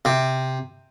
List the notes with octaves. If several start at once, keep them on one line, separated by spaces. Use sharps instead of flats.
C3